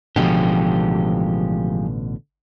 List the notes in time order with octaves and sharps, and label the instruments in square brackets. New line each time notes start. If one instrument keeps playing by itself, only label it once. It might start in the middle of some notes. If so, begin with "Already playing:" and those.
[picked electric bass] A1 B2 D3 [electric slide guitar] F3 G#3 G4